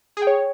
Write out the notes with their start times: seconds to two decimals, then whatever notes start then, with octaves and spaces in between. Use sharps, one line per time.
0.17 G#4
0.22 G5
0.27 C#5